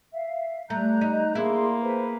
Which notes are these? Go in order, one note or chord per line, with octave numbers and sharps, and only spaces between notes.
E5 F5
G3 A3 A#5 F#6 G6
D#4
A#3 D4 E4 G#4 C6
G#4 B4 C5 B5